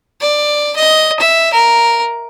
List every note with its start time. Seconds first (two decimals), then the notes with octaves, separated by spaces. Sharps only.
0.21 D5
0.77 D#5
1.20 E5
1.53 A#4